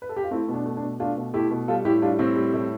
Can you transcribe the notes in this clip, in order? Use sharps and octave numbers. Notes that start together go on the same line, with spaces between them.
B4
A4
G4
F4
A3 C4 E4
B2
D4
A3
D4
B2
A3 D4 F4
B2
A3 E4 G4
B2
G3 F4 A4
A2 E4 G4
G3 D4 F4
A2 C4 E4
G3
A2